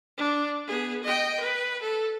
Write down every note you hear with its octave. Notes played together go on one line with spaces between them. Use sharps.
D4
B3 G#4
D#5 G5
B4
A4